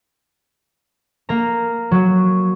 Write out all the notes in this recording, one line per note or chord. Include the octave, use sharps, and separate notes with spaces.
A#3 A#5
F#3